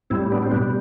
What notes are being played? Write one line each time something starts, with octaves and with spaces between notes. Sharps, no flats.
A2 G3 C4 E4
B3 D4
C4
G3 B3 D4
B2